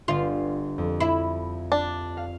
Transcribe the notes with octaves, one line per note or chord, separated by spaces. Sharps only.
G1 F4 C7
F2
E4
D4
F5